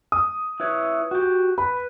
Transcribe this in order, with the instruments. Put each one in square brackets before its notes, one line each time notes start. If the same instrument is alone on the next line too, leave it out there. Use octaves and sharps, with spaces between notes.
[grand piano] D#6
[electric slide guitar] E4 B4 C#5
F#4 G4
[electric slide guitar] B4 [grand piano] B5